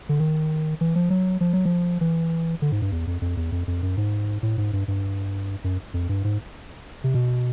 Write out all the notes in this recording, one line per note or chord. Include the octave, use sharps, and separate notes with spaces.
D3
D#3
E3
F3
F#3
F3
F#3
F3
E3
D3
G#2
G2
E2
F2
F2
E2
F2
F2
F#2
G#2
A2
G#2
G2
G2
F#2
F2
G2
G#2
C3
B2